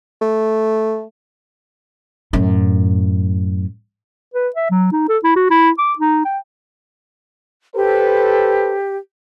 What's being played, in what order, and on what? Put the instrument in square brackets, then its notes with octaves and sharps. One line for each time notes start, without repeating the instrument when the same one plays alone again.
[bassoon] A3
[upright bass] F#2 A2
[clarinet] B4
E5
F#3
D#4
A4
E4
F#4
E4
D6
D#4
G5
[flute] G4 [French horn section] A4 B4 C5